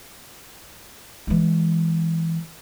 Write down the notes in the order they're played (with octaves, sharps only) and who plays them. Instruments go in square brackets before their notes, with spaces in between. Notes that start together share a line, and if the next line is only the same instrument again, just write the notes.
[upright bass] E3 G#3